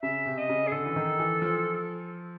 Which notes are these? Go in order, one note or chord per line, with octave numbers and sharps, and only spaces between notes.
C#3 E5
C3
D#5
C#3
G#4
D3 A4
E3
D#3
E3
F3